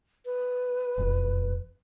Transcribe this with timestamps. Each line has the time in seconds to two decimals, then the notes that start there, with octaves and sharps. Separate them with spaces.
0.25 B4
0.97 E1 F2